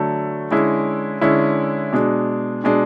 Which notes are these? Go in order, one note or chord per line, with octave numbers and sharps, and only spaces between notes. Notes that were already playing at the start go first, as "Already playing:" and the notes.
Already playing: D3 F#3 A3
D3 G#3 C#4 E4
D3 G#3 C#4 E4
B2 G#3 D4
B2 G#3 D4